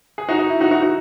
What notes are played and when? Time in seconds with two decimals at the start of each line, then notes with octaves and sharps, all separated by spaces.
0.18 G#4
0.29 D#4 F#4
0.39 D#4
0.50 E4
0.60 D#4 F#4
0.71 D#4 F#4
0.82 D#4 F#4